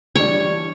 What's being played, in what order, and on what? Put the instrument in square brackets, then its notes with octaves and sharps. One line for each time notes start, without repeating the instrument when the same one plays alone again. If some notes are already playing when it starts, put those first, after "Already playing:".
[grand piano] E3 G3 D4 [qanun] C#5